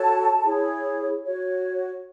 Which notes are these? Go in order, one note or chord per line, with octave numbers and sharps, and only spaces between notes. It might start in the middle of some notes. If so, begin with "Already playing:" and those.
Already playing: F#4 A4 C#5 A5
E4 G#4 C#5
F#4 C#5